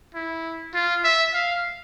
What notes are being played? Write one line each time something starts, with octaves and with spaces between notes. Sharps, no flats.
E4
F4
E5
F5